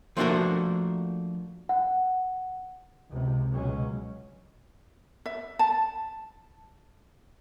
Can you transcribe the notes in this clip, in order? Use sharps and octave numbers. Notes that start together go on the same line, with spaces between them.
F3 A3 A#3 D4 F#4 A#4
F#5
C#2 C3
C#2 B2 F#3 G#3 C#4
E5
A5